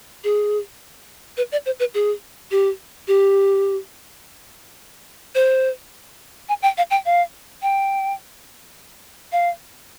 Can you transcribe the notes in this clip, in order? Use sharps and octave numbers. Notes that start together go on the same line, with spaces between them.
G#4
B4
D5
C5
B4
G#4
G4
G4
C5
G#5
G5
F5
G5
F5
G5
F5